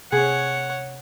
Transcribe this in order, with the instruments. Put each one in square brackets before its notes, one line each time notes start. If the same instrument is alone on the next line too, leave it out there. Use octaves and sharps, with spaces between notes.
[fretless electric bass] C3 [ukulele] G#4 [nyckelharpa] C#5 F#5